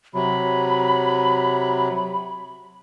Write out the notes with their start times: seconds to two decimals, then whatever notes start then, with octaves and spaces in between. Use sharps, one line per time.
0.14 C3 F#3 B5